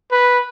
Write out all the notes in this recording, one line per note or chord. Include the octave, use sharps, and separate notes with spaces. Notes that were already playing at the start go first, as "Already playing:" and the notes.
B4